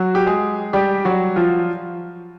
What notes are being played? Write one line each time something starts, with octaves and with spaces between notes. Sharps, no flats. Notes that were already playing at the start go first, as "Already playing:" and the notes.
Already playing: F#3 F#4
G4
G#3 G#4
G3 G4
F#3 F#4
F3 F4